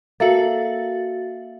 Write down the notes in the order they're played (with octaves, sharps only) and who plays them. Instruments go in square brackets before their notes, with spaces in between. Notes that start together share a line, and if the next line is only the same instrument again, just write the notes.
[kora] A#3 A4 [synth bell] F#4 A6 [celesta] E5